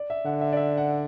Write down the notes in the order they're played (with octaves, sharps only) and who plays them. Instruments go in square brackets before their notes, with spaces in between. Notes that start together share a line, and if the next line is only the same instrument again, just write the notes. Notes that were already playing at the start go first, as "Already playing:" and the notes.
Already playing: [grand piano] D5
E5
[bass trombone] D3 [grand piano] F#5
[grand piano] E5
D5
E5
F#5